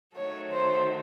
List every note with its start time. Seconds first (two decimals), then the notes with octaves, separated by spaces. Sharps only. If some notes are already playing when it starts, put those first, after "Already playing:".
0.16 D#3 F#3 A3 C#5
0.52 C5